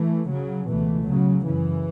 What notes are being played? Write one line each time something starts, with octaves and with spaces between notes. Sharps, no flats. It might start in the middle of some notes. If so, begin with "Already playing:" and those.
Already playing: E3 A3
C#3 F#3
C#2 B2 E3 A3
C#3 F#3
F#2 C#3 E3